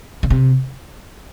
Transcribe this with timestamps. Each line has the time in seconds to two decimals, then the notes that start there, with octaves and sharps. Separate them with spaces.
0.23 C#3
0.30 C3